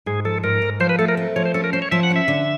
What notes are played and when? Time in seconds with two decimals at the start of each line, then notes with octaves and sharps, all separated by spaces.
0.06 G#2 G#4
0.25 F3 A4
0.43 G#2 A#4
0.62 G#2
0.80 F3 C5
0.89 B4
0.99 A3 A4
1.08 A#4
1.17 C4
1.36 F3 C#5
1.45 C5
1.54 C#4 A4
1.64 A#4
1.73 C#4 C5
1.82 C#5
1.92 F3 E5
2.03 F#5
2.10 C#4
2.16 E5
2.28 D3